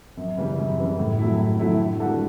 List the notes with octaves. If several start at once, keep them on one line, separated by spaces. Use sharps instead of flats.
F#2
C#3 E3 G3
F#2
C#3 E3 G3
A2
F#3 A3 E4
A2
F#3 A3 E4
D3
G3 D4 F#4 A4